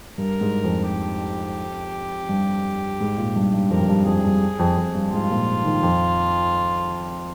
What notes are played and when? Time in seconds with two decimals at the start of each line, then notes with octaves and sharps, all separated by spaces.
0.18 G2 A#4
0.41 G#2
0.64 F2
0.88 G4
2.29 G2
3.00 G#2
3.18 A#2
3.36 G2
3.54 G2
3.70 F2 A#4
3.81 F2
3.89 G2
4.06 F2 G#4
4.24 G2
4.59 F2
4.77 F2
4.95 G2
5.12 G#2 F4
5.30 A#2
5.65 D#3
5.83 F2